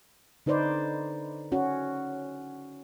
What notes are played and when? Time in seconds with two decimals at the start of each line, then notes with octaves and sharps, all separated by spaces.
0.46 D3 D#4 B4 C5 D5
1.52 C#4 F#4